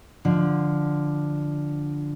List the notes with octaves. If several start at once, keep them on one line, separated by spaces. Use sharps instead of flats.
D3 F3